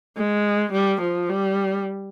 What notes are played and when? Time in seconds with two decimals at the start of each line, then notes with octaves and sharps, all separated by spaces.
0.17 G#3
0.73 G3
1.01 F3
1.29 G3